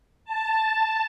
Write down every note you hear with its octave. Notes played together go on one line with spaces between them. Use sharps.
A5